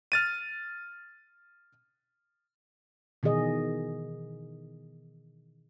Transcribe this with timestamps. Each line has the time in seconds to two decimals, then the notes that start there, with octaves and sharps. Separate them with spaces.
0.12 F6 A6 D#7
3.23 B2 D#3 E3 G#4 D#5